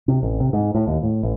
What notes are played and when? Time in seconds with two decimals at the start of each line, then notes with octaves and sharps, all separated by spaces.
0.08 C3
0.23 A1
0.40 C3
0.53 G#2
0.75 A2
0.87 D#2
1.03 A2
1.23 A1